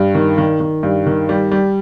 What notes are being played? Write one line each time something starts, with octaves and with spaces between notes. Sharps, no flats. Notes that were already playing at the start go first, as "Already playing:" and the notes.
Already playing: G2
D#3
D#3
D#3
G2
D#3
G3
G3